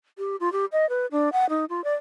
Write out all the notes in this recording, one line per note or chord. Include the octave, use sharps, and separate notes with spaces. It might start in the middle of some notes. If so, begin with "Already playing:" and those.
G4
F4
G4
D#5
B4
D4
F#5
D#4
F4
D5